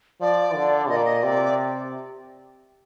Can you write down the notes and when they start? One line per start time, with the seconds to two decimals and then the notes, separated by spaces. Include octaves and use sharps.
0.21 F3 D5
0.55 D3
0.89 A#2 D#5
0.96 D5
1.05 D#5
1.23 C3 D5